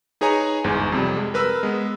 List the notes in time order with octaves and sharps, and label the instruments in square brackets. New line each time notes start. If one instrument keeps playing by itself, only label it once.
[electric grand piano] D#4 G#4 B4 C#5 G#5 A#5
G1 E2 G#2
F2 C3 G3
G#3
A#4 B4 B5 E6
G#3 B3